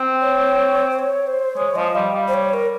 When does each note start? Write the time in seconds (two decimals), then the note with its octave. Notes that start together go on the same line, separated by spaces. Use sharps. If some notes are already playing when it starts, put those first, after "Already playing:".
Already playing: C4
0.21 C#5
0.91 C5
0.99 C#5
1.27 C5
1.56 G#3 C#5
1.76 F3 D#5
1.95 G3 F5
2.14 G3
2.28 C5
2.34 C#5
2.53 A#4